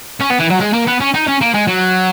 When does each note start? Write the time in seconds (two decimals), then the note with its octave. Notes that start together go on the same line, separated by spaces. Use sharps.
0.20 C#4
0.30 B3
0.39 E3
0.50 F#3
0.60 G#3
0.73 A#3
0.87 B3
1.00 C#4
1.14 D#4
1.27 C#4
1.41 A#3
1.54 G#3
1.68 F#3